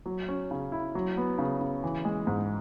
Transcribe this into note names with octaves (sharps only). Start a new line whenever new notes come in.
F#3
C#4
C#3
E4
F#3
B3
C#3
C#3
E3
G#3
G#2